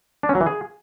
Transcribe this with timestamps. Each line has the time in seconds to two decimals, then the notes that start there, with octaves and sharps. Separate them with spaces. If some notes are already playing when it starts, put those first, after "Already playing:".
0.23 D4
0.29 C#4
0.35 F#3
0.41 E3
0.46 G#4